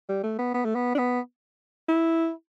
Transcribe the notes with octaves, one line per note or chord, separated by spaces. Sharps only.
G3
A3
B3
B3
A3
B3
D4
B3
E4